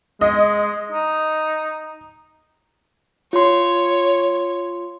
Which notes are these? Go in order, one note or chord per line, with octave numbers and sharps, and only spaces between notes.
G#3 D#5
D#4
F4 C#5 C6